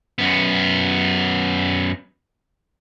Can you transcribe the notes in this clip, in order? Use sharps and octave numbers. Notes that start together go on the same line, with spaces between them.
F#2 B3